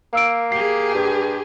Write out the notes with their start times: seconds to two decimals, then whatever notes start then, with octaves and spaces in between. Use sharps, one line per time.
0.13 A#3 F5 E6 D7
0.52 G4 G#4 C7
0.95 G2